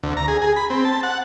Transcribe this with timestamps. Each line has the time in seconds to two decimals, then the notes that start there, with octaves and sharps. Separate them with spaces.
0.03 D2
0.17 A#5
0.28 G#4
0.42 G#4
0.56 B5
0.70 C4
0.85 A5
1.03 F#5